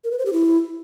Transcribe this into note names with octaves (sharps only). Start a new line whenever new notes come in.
A#4
B4
C5
G4
E4